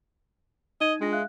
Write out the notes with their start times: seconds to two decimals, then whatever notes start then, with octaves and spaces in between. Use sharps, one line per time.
0.81 D#4 D#5 G#6 D#7
1.01 G#3 D4 F4 A#6
1.12 E5 F5 F#6